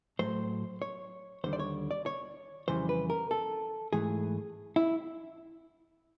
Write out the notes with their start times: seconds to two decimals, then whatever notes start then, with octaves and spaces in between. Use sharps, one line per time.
0.19 A2 F#3 A3 C5
0.82 C#5
1.44 D#2 D3 G3 C5
1.53 D5
1.59 C#5
1.91 D5
2.06 C#5
2.68 F2 C#3 E3 G3 C5
2.89 B4
3.10 A#4
3.31 A4
3.93 G#2 E3 A3 G#4
4.76 E4